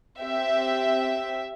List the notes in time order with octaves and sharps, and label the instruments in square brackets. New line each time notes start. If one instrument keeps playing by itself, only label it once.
[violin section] C4 G4 E5